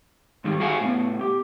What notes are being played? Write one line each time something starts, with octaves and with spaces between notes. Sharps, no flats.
G#2 D#3 G3
F#4 G#4 F5 F#5 G#5
A2 B3
G4